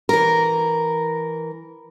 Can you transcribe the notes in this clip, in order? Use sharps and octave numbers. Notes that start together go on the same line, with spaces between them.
E3 A#4